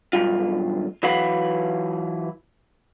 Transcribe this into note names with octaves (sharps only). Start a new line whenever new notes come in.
B1 G2 F4
E3 F#3 B4 F5 F#5 B5